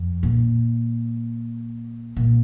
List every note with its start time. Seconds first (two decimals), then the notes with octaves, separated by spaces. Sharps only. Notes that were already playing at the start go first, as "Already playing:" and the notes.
Already playing: F2
0.23 A#2
2.17 A#2